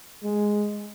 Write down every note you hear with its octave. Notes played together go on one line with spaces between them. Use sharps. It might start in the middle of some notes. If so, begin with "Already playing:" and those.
G#3